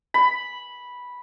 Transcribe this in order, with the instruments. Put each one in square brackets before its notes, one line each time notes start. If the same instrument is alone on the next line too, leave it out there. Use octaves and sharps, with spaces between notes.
[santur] B5